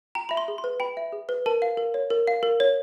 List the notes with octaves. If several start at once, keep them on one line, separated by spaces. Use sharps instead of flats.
G5 A#5
E5 B5
C6
G#4
C6
B4
G5 B5
E5
G#4
B4
A#4 A5
F5
A#4
C#5
A#4
F5
A#4
C#5